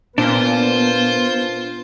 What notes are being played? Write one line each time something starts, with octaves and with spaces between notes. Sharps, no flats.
A#2 B3 D4 F4 C5